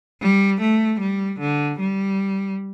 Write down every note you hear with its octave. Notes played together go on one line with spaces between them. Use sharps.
G3
A3
G3
D3
G3